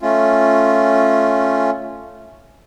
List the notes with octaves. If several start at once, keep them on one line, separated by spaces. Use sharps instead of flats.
A3 C#4 F4